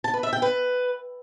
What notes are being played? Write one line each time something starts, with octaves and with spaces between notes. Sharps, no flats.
A5
B4
E5
G5
B4